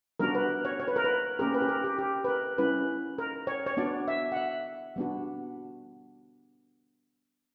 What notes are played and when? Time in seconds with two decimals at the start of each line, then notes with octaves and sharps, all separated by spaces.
0.20 G3 B3 D4 F#4 A#4
0.35 B4
0.65 C#5
0.80 C#5
0.88 B4
0.96 A#4
1.04 B4
1.39 A#3 C#4 G4 A#4
1.54 B4
1.62 G4
1.69 A#4
1.84 G4
1.98 G4
2.24 B4
2.28 A#4
2.58 G3 C#4 E4 B4
3.18 A#4
3.47 C#5
3.67 C#5
3.77 B3 D4 F#4 D5
4.08 E5
4.32 F#5
4.36 E5
4.96 G3 B3 D4 F#4